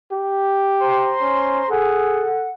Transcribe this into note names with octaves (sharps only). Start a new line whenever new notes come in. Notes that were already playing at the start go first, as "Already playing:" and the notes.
G4
C5 A#5 C6
C#4
G#4 A4 F#5